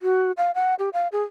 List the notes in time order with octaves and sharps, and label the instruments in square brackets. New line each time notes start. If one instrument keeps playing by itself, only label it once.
[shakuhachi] F#4
F5
F#5
G4
F5
G#4